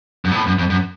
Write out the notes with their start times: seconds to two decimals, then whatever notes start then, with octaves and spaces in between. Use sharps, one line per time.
0.25 F#2
0.31 A#2
0.36 A2
0.47 F#2
0.59 F2
0.70 F#2